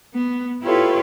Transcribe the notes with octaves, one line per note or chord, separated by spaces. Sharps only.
B3
E4 F4 G4 A4 B4 C#5